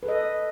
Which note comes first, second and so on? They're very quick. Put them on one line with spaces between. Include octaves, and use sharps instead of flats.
B4 A4 D#5